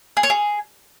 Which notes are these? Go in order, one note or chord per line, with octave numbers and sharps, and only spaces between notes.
G#4
C#5
G#4